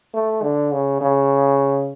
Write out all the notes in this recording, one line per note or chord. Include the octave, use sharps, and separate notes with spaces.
A3
D3
C#3
C#3